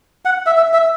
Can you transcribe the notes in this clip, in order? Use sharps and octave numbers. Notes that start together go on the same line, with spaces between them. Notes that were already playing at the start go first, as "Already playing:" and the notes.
F#5
E5
E5
E5